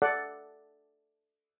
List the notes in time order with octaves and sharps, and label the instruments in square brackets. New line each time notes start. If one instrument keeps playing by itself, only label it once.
[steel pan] A4 D5 F#5